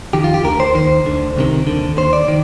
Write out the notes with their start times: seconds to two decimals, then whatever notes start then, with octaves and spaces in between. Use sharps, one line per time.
0.13 F2 D#3 G4
0.24 F4
0.34 G4
0.44 D2 D3 A#4
0.60 C5
0.75 D#2 D#3 C5
1.05 D2 D3
1.36 C2 C3 D#3
1.67 D#2 D3
1.98 D#2 D#3 C5
2.13 D5
2.28 D#3